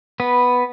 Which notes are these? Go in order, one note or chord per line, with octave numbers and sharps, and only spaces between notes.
B3 B4